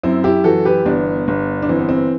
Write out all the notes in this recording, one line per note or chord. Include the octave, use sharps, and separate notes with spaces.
F#2 C4 E4
E4 G4
E3 F#4 A4
G4 B4
G1 B3 D4
G1
D4
E3 C4
B3
C4